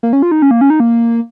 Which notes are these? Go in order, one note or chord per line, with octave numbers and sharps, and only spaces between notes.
A#3
C#4
F4
D#4
C#4
A#3
C#4
D#4
A#3